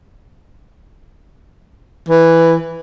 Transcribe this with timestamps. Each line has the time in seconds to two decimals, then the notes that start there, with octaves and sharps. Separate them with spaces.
2.09 E3